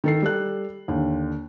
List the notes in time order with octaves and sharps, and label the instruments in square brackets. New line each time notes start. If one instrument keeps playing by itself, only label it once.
[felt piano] D#3 A4 C7
G3 A4 F#6
D#2 D3